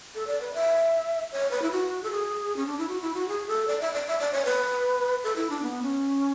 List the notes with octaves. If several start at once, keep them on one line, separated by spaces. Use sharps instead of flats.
A4
D5
B4
E5
C#5
B4
E4
F#4
A4
G#4
C#4
D4
E4
F#4
E4
F#4
G#4
A4
D5
E5
D5
E5
D5
C#5
B4
A4
E4
D4
B3
C#4